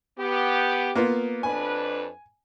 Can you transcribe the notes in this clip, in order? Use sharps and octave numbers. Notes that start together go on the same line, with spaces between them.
B3 G4
A#3 B3 F4
F2 D4 B4 G#5